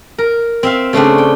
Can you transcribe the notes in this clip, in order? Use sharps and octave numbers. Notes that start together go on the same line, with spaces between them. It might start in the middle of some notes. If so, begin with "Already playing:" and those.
A#4
C4 E5 F5
C#3 A3 C4 D4
G5